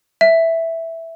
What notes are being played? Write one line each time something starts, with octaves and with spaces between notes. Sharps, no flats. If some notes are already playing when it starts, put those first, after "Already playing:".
E5